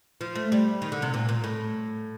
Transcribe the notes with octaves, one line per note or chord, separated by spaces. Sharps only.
F3
A3
G3
D#3
D3
C3
A#2
A#2
A2